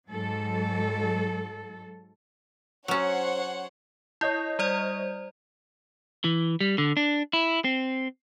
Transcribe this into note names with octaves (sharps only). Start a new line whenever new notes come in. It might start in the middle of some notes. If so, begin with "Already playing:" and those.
G#2 F#3 A4
F#3 C#4 C5 C#5 F#5
E4 C#5 D#5 G6
G3 C5 D5
E3
G3
D3
D4
E4
C4